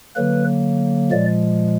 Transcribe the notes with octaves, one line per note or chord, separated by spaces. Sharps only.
D3 F#3 A#3 B4
A#2 F3 G#3 D5